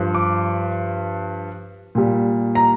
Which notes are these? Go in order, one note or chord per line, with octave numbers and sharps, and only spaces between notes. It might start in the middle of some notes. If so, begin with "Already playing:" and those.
Already playing: G2 F3
D6
A#2 G3
A#5